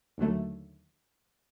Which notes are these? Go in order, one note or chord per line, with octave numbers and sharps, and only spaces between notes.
D#2 D3 F#3 A3